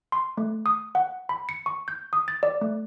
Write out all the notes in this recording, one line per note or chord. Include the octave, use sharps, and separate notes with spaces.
C6
A3
D#6
F#5
B5
C#7
C#6
G6
D#6
A6
D5
A3